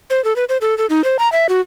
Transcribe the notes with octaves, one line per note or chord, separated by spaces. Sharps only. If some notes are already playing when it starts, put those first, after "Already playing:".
C5
A4
B4
C5
A4
A4
D#4
C5
A#5
E5
F#4